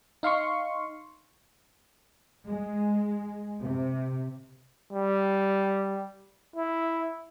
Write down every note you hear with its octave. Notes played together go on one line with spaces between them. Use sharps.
D#4 F5 C6 C#6
G#3
C3
G3
E4